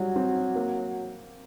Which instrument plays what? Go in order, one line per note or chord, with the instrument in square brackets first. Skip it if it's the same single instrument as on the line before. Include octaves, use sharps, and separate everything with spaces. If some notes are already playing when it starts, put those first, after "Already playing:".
Already playing: [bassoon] F#3 [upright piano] G3
[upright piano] C4
A#3